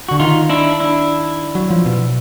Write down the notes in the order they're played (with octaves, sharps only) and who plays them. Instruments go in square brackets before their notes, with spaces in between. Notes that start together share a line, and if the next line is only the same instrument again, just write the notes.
[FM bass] D3 [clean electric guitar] F#4
[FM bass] D#3 [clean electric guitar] D#4 F4
[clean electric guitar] D4 E4
D4 E4
[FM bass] F#3
F3
B2